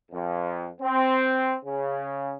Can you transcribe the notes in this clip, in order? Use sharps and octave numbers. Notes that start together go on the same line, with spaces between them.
F2
C4
C#3